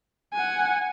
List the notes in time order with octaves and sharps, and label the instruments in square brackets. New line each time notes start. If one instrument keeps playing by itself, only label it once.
[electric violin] F#5 G#5